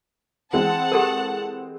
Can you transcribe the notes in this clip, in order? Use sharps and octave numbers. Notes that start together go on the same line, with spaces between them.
E3 G#3 C4 F#5 A5
G4 A4 A#4